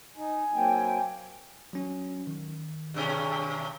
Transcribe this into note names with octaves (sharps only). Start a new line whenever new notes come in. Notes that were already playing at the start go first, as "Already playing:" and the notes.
D#4 G#5
F#3 A#3 C4 G5
F#3 C#4
D#3
G2 B2 C#4